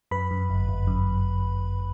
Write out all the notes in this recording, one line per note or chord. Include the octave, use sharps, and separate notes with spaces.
F#2 B4 B5
F#2
G1
G1
F#2